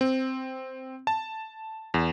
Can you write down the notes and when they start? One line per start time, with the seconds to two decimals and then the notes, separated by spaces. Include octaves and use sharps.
0.01 C4
1.07 A5
1.94 E2